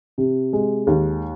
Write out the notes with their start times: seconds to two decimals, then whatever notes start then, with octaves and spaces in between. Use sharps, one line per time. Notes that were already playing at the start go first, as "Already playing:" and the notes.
0.18 C3
0.53 G#3
0.87 D#2